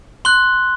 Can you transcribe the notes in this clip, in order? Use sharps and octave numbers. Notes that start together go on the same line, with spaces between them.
C6 F#6 G7